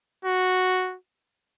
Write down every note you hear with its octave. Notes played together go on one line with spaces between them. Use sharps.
F#4